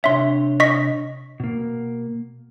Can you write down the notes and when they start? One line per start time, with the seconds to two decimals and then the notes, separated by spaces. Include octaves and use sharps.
0.04 C3 D4 C#5 E5 C6
0.60 D#5 C#6 B6
1.40 B2 A#3